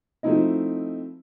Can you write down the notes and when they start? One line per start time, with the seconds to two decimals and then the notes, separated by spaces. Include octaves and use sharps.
0.23 F3 A3 C4 D#4 E4 D#5